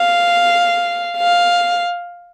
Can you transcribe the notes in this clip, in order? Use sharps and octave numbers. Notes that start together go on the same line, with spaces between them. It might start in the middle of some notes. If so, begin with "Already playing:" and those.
Already playing: F5
F5